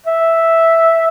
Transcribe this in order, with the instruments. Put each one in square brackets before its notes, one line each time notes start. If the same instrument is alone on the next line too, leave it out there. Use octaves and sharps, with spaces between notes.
[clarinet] E5